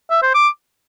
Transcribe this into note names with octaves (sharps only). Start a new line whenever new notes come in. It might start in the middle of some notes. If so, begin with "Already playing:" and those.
E5
C5
D6